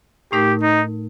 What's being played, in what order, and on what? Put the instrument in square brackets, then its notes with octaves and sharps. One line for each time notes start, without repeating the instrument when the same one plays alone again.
[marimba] A2 A3 D#4 A#4 [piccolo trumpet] G4
[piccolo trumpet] D#4